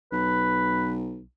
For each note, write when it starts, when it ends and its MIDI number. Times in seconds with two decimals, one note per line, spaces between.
0.12 1.23 35
0.12 0.92 71